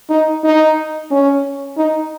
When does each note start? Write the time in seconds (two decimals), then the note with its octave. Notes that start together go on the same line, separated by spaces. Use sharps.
0.10 D#4
0.44 D#4
1.11 C#4
1.78 D#4